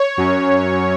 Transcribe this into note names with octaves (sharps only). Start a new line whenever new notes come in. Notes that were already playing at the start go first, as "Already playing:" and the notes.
Already playing: C#5
F#2 F#3 C#4